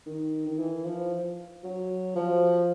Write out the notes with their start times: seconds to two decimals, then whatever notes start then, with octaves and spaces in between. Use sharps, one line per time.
0.06 D#3
0.47 D#3
0.59 E3
0.85 F3
1.64 F#3
2.16 F3